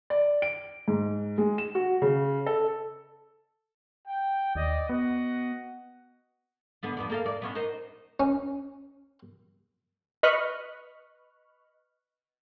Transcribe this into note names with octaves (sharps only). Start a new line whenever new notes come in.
D5
D7
G#2
G#3
E7
F#4
C#3
A4
G5
D#2 D5 D#5
B3 F#4 D#5 F#5
D3 B3 D4
F2 B3 D5
A#3 A4 F5
D5
B3 C#4 D4
D#4 A#4 C5
C#4
B4 D#5 B5 C#6 F6 F#6